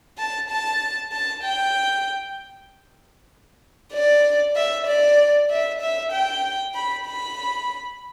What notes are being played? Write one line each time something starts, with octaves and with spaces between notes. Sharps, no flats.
A5
A5
A5
G5
D5
E5
D5
E5
E5
G5
B5
B5